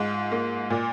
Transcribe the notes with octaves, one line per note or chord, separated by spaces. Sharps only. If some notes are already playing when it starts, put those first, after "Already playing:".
Already playing: G#2 F4
A#3
A#2